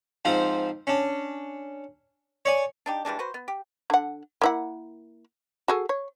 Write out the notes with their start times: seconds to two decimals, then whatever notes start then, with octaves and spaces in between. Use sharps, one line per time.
0.25 G#2 F3 C4 F4
0.87 C#4 D4
2.45 C#5 D5 G#5
2.86 D4 D#4 G4
3.05 E3 G3 G#3 D4
3.19 F#4 B4 C5
3.34 B3
3.48 G4
3.90 D3 F#5
4.42 A#3 E4 F#5
5.68 F#4 G#4 A4
5.89 C#5